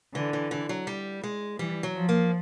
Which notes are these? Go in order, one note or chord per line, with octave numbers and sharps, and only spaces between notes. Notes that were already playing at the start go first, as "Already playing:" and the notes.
D3 E3
E3
E3
F#3
G3
G#3
E3 G3
F#3
F3
A#3